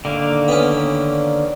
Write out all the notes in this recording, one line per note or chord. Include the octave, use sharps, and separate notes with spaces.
D3 D#3 A#3
B3 C#4